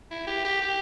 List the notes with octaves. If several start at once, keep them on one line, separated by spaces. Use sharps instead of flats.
E4
G4
G4
G4